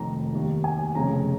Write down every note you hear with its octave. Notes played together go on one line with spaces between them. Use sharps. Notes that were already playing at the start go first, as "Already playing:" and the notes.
Already playing: F1 F2 D#3 A#5
D#2 D#3
G#5
F1 F2 C#3 F3 A#5